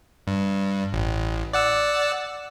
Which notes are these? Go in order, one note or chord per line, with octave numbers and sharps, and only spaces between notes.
G2
A1
D5 F#5 E6